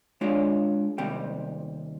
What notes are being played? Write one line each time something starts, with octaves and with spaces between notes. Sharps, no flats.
G#3 D4 F4 C#5 D5
D#2 C3 G3 G5